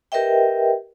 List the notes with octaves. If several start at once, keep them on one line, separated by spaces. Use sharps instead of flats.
G4 A#4 B4 D#5 E5 G5